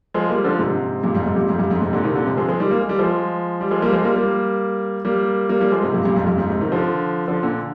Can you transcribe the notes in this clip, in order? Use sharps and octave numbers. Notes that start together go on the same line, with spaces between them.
F3 G#3
G3 A#3
D3 F3
G#2 C3
G2 A#2
F2 G#2
G#2 C3
G2 A#2
F2 G#2
G2
F2 G#2
G#2 C3
A#2 D3
C3 D#3
A#2 D3
G#2 C3
F3 G#3
F3 G#3
D#3 G3
A#3
G#3
G3
F3 G#3
G3
F3 G#3
G3 A#3
F3 G#3
G3 A#3
G3 A#3
G3 A#3
G3 A#3
G3 A#3
F3 G#3
G#2 C3
G2 A#2
G2 A#2
F2 G#2
G2
F2 G#2
G#2 C3
C3 D#3
D3 F3
D3 F3
A#2 D3